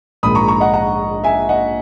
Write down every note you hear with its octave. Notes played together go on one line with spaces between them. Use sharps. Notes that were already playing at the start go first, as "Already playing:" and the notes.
A#1 G#2 D#3 B5 D#6
A#5 C#6
A#5 C#6
D#5 F#5
F#5 A#5
E5 G#5
D#5 F#5